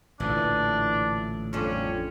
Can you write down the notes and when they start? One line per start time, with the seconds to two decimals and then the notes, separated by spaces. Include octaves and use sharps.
0.20 A1 A#2 D3 E3 D4
1.53 F2 C#4 D4